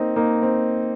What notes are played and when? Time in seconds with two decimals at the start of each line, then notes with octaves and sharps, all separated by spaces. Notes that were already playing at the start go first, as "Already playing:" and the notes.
Already playing: A#3 C4 D#4
0.16 A#3 D#4
0.43 C4